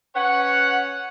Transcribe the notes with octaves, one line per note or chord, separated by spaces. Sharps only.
C#4 B4 C#5 F#5